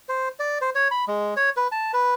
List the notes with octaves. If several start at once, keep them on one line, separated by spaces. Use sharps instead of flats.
C5
D5
C5
C#5
B5
G#3
C#5
B4
A5
B4